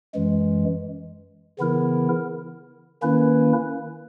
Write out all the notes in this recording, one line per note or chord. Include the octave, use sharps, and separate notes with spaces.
F#2 E3 G#3
C#3 E3 B3 E4 A#4
D#3 A#3 C#4 E4 B4